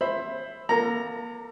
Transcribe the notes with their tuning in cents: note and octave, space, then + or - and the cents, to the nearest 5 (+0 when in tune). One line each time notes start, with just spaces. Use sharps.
C5 +15 E5 +0 B5 +15
A#3 +30 A4 +45 A#5 +0